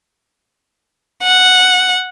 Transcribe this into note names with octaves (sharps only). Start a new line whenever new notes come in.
F#5